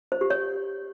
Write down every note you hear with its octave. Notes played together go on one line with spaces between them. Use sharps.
C5
G4
C#5